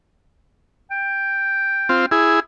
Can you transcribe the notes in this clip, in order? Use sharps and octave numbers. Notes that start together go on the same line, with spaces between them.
G5
C4 F4
E4 G#4